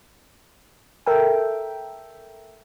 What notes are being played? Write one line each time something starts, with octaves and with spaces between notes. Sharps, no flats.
A4 A#4 E5 G5